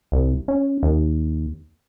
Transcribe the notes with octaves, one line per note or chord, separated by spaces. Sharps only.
C2
C#4
D#2